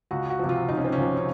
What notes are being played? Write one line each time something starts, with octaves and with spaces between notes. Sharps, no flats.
C#2 F#4
F#4
C3 F3
F4
C#2 D#4
C#4
C4
C#4
C3 F3
C#4